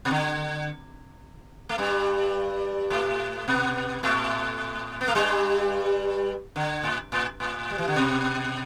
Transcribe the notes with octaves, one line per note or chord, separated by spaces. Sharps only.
B2
D3
A3
G2 G3
A2 A3
B2 B3
A2 A3
B3
A3
G2 G3
D3
A2
A2
A2
G3
E3
D3
B2